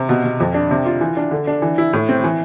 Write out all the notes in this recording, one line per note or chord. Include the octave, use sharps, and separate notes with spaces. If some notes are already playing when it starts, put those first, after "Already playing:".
Already playing: C3
B2
B2
F2
D4
C3
F4
E3
D4
D3
D4
E3
E4
A2
C4
E3